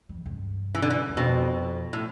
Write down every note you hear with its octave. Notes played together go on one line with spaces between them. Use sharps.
G3
C3
F2
G2
E3
D3
E3
E2
F2 B2
A2